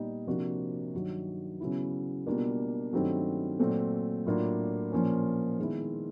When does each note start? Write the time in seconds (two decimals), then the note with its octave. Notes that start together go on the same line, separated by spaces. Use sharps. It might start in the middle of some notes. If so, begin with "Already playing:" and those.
Already playing: A#2 G3 B3 D#4
0.27 C3 F3 A#3 D4 F#4
0.94 G2 D#3 F#3
1.60 C#3 F#3 B3 E4
2.26 B2 G3 A#3 D4 F4
2.93 G2 D#3 F#3 A3 C4
3.59 A#2 F#3 A3 C4
4.26 A2 F#3 A#3 D4 F4
4.92 A#2 F3 A#3 C#4
5.59 D#3 G#3 B3 E4